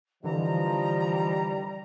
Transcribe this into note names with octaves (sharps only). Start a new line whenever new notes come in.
D3 E3 F3 G3 D#5 A#5